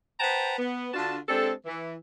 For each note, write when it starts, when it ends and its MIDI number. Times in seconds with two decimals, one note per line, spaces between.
0.20 0.57 71
0.20 0.57 72
0.20 0.57 78
0.20 0.57 79
0.20 0.57 81
0.20 0.57 82
0.59 0.90 59
0.94 1.17 50
0.94 1.17 62
0.94 1.17 65
0.94 1.17 66
0.94 1.17 81
1.29 1.51 56
1.29 1.51 60
1.29 1.51 62
1.29 1.51 67
1.29 1.51 69
1.66 1.94 52